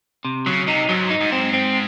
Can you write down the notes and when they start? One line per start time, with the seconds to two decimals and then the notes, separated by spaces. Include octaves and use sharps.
0.25 C3
0.46 C#3 F#3
0.67 C3 D#4
0.89 G#2 F#3
1.10 D#4
1.21 G#2
1.32 C4
1.53 C4